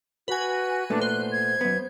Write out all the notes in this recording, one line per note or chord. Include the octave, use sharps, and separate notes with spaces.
F#4 B4 G#5
A#2 A3 B3 D4
C5 F#6
G#6
F#2 B3